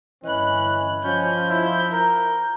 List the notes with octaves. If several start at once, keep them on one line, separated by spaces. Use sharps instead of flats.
G1 E3 C#4 D#5 B5 F#6
F3 C#4 G6
E4
A#4 A#5